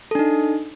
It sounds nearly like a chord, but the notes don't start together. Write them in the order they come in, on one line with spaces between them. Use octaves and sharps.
A4 D4 D#4